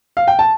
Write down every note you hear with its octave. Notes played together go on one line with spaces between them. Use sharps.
F5
G5
A5